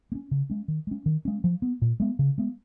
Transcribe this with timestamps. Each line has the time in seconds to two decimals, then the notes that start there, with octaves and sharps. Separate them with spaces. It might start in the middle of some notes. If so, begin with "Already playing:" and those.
0.12 A#3
0.15 C#4
0.31 C#3
0.50 G#3 C#4
0.68 D#3
0.87 G#3 C#4
1.06 D#3
1.25 G#3 C#4
1.44 F3
1.62 B3
1.82 A#2
2.00 G#3 B3
2.19 C#3
2.38 G#3 B3